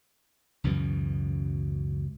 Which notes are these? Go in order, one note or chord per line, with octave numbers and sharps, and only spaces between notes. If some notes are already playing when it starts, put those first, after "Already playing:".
C#2 F#2 B2 E3